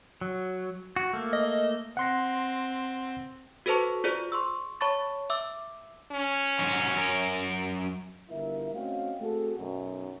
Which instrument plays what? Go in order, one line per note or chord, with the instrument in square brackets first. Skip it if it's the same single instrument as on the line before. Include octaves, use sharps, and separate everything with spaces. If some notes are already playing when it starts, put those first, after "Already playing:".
[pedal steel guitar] F#3
F#4
A3 A#3
[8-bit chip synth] D#5
[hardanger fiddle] C4 [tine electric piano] F#5 C6 A#6
[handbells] F#4 A4 B4 C5 A5 C#6
F4 G#4 C5 D5
C6 C#6 E6
C#5 A5 B5 C#6 A6
E5 D6 E6
[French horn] C#4
[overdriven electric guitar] G#2 F#3
F#2 A#4
[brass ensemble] G1 E4 F4 A#4 E5
A3 C4 C#4 F#4 D#5 F5
A3 C4 F#4 G#4 A4
B1 F#2